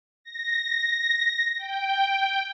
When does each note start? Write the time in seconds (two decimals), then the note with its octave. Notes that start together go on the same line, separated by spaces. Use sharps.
0.24 A#6
1.57 G5